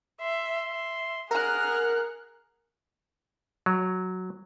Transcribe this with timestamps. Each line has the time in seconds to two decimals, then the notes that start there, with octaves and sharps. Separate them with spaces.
0.21 E5 C6
0.70 E5
1.31 G#4 A#4 F#5 F6 F#6
3.66 F#3